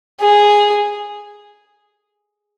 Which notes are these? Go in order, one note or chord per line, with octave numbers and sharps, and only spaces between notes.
G#4